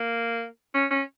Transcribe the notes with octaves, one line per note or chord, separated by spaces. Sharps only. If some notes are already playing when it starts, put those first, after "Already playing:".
Already playing: A#3
C#4
C#4